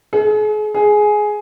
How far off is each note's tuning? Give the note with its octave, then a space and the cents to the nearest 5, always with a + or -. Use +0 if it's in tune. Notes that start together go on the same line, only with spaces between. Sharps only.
G#4 +40
G#4 +10